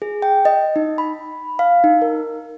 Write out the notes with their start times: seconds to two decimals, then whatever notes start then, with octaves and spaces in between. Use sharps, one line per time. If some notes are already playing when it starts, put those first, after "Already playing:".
0.02 G#4
0.22 G5
0.45 D#5
0.76 D#4
0.98 B5
1.59 F5
1.84 D#4
2.02 A#4